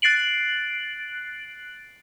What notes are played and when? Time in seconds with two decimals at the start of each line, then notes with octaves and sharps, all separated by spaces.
0.02 F#6 A6 C7 D7 F#7